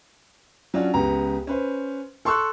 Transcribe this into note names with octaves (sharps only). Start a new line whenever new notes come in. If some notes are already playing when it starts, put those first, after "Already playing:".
F#3 C#4 D4 F4 F#4
C#2 B3 G4 A#5
C#4 B4 C5
A4 C6 C#6 E6 F#6